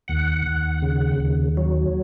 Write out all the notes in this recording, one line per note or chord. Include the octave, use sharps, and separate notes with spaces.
D#2 F#5
D#2
C#3
D#2
F#3